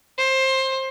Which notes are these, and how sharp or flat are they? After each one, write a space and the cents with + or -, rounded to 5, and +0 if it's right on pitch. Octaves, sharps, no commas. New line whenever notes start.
C5 +20